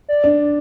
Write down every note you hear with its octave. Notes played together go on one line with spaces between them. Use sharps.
D5
D4